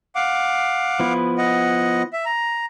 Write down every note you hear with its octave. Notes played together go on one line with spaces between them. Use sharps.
F5 F#5 D6
F3 B3 E4
D#5 F#5
E5
A#5